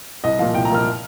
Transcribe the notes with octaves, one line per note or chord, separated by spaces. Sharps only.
C2 D#5
A#2 F3 F5
C2 G5
A#5
A#2 F3 F6